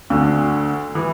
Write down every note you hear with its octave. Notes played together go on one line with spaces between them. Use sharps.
D2 D3
E3